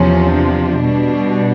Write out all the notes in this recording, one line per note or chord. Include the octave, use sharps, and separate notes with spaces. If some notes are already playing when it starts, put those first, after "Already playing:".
Already playing: E2 C3 F3 C#4
D4
B2 G3